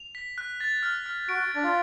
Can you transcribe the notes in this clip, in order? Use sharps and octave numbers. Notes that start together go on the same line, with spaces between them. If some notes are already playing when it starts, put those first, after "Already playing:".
Already playing: F7
B6
F#6
A6
F6
F6
F#4 D7
D4 A6
F4